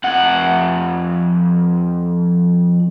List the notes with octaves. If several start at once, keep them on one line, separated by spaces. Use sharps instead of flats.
F2 F#5